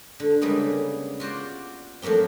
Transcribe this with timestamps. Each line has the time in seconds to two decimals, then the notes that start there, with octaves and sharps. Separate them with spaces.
0.20 D3
0.41 C#3 G3 G#3 A#3 B3
1.20 F4 F#4 C5 D5
2.02 F3 F#3 A3 A#3 C4